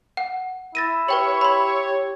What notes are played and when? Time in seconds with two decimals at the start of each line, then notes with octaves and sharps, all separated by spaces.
0.17 F#5
0.75 E4 A6 A#6 D#7
1.08 G4 B4 C#5 G5 F#7
1.41 B5 C6